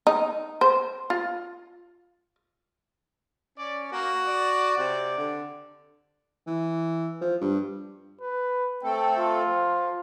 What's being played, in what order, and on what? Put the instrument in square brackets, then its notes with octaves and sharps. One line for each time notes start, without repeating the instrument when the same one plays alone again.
[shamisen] D#4
C5
F4
[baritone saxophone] C#4 [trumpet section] D5
[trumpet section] A#3 [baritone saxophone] F#4
[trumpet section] D5
[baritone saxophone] C3
D3
[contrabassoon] E3
F3
G2
[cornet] B4
[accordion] A3 C4 A4 [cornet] G5
[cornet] F4
[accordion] F3